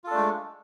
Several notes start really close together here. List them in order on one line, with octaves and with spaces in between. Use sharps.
F4 A4 D4 A3 G#3